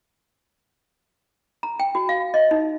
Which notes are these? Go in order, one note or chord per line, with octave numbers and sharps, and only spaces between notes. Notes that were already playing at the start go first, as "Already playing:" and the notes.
A#5
G5
F#4
F5
D#5
D#4